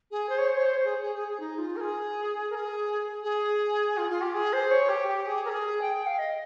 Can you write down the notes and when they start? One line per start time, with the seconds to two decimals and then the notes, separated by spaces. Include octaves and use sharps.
0.11 G#4
0.29 C5
0.38 C#5
0.48 C5
0.57 C#5
0.66 C5
0.84 G#4
1.03 G#4
1.15 G#4
1.28 G#4
1.40 D#4
1.58 F4
1.76 A#4
1.80 G#4
2.50 A#4
2.55 G#4
3.23 G#4
3.97 F4
4.09 F4
4.22 G4
4.34 G#4
4.53 C5
4.71 C#5
4.89 G4
5.08 G4
5.26 G#4
5.45 A#4
5.49 G#4
5.81 G5
5.94 G5
6.07 F5
6.18 D#5